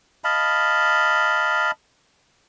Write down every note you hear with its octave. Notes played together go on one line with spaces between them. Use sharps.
D#5 F5 A5 B5